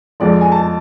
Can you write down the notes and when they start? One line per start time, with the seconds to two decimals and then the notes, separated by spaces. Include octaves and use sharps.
0.20 F2 F3 G#3 D5
0.41 G#5
0.52 A5